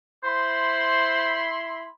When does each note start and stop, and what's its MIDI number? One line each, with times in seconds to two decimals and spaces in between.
0.23 1.85 64
0.23 1.47 72
0.23 1.85 83
0.23 1.85 84